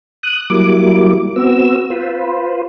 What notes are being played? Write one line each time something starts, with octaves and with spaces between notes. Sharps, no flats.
D#6 F#6
F#3 G3 A#3 E4 D6
B3 C4 F#4 E6
F4 B4 C5